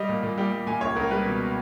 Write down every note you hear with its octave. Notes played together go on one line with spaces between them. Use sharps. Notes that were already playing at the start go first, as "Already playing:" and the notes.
Already playing: G3 D#5
A#2
A#2
G3 G5
G3
A#2 G#5
C#2 C#5
C#2 A#4
G3 B4
B2